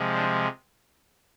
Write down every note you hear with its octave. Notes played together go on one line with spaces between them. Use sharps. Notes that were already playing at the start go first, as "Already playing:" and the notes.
Already playing: C3 F3 G#3
D4